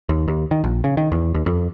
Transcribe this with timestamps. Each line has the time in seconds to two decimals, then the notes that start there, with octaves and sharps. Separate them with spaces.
0.09 D#2
0.28 D#2
0.51 D#3
0.64 A#1
0.84 C#3
0.97 D#3
1.12 E2
1.34 D#2
1.46 F2